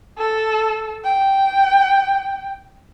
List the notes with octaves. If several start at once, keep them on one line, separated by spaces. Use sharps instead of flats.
A4
G5